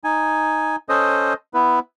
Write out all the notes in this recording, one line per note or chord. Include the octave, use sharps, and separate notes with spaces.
D#4 G#5
C#4 A4 C5 D#5 D#6
B3 E4 B4